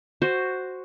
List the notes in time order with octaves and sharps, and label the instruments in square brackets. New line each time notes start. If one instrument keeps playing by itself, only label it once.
[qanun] F#4 C5